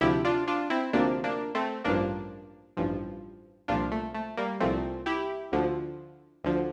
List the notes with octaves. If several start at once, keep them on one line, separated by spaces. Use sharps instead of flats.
D2 C3 F3 E4 G4
D4 F4
D4 F4
C4 E4
D2 C3 F3 A#3 D4
A#3 D4
A3 C4
A1 G2 F3 A#3 D4
A1 G2 F3
C2 A#2 F3 D4 F4
A3
A3
G3 A#3
C2 A#2 F3 A3 C4
E4 G4
D2 D3 F3
D2 D3 F3